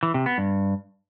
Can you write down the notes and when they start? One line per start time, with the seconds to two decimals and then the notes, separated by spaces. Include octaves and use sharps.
0.03 E3
0.14 C3
0.26 B3
0.38 G2